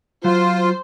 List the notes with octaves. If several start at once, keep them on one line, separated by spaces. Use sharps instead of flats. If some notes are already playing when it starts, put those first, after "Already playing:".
F#3 F4 C5